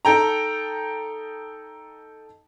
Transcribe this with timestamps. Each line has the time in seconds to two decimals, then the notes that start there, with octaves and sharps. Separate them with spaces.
0.05 D#4 A4 G5 A#5